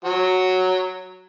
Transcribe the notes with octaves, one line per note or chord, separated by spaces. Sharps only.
F#3 F#4